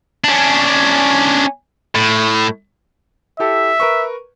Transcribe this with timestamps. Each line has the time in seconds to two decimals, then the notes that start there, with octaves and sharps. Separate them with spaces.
0.24 C#4 D4
1.95 A2
3.39 E4 G4 A4 E5
3.80 A#4 B4 C#6